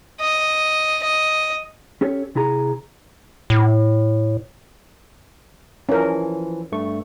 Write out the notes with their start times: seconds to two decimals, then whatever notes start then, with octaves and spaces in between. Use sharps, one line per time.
0.21 D#5
1.03 D#5
2.01 C#4 G4 A4 C#5
2.35 C3 E4 G#4 A#5
3.50 A2
5.89 E3 F3 C#4 A#4
6.72 G2 A3 C#6